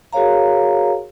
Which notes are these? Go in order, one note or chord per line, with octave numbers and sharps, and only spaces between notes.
F#4 G#4 A#4 C#5 F5 A#5